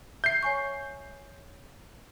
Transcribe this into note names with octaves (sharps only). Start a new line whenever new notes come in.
E5 G6 C7
C#5 G#5 C#6